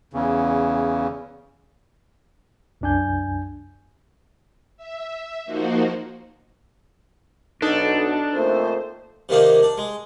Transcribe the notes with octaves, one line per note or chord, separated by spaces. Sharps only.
E2 C#3
C2 F#2 D4 G#5 G6
E5
F3 A#3 D#4 F#4 C5
B1 D4 D#4 A4
F2 A#2 A3 C5
C3 D#3 A#3 D4 D#4
D4
G#3